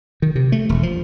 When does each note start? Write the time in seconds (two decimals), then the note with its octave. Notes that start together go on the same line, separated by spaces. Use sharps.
0.22 D#3
0.35 C3
0.52 A3
0.69 E1
0.83 F3